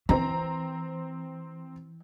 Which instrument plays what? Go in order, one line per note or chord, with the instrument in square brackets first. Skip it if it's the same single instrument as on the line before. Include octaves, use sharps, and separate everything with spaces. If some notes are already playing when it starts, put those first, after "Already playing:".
[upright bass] E3 [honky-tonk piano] C4 A#5